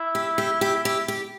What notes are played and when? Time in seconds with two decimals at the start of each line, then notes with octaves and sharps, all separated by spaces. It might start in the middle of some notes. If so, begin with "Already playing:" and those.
Already playing: E4
0.15 G4
0.38 G4
0.61 G4
0.85 G4
1.08 G4